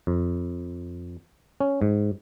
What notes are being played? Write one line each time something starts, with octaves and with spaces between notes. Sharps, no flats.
F2
C#4
G#2